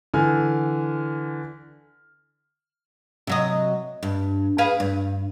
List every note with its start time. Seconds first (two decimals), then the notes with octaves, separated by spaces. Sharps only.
0.14 D3 E3 G#5 F6
3.27 C3 F#3 D#5
4.03 G2
4.58 G#4 B4 F5
4.80 G2